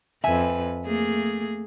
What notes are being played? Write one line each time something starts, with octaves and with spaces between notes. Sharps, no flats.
F2 B4 E5 G#5
A3 A#3 G#4